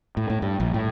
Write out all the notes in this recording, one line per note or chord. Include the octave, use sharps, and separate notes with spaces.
A2
A2
G2
A#1
A2